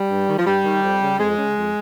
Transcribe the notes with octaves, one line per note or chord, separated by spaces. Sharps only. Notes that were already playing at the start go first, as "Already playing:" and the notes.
Already playing: G3
G2
D#3
F3
G2 G3
D#3
F2
C#3
F2 G#3
C#3
F2